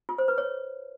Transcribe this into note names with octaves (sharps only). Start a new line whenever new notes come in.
F4
C5
B4
C#5